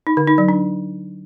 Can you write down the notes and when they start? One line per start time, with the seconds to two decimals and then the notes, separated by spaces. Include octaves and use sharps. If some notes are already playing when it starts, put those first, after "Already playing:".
0.07 D#4
0.17 D3
0.28 D#4
0.38 F#3
0.48 D4